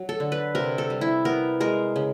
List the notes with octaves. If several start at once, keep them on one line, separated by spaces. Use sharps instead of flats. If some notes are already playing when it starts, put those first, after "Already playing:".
Already playing: F#3
A4
D3
B4
C3 A#4
A4
G3
E4
B3 A#4
G#3 A#4
C#3